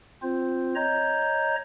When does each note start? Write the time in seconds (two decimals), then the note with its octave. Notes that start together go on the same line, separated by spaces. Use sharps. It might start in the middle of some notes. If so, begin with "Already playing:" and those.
0.23 C4 F4 C5
0.75 C#5 D#5 A#5 G6